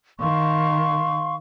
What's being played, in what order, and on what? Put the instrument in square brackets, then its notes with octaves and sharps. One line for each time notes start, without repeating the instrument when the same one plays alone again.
[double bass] D#3 [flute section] F5 C6 C#6